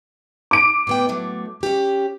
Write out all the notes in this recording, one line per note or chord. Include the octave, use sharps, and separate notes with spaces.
D6 D7
A2 B3 G5
A2 F#3 A3
C#4 G4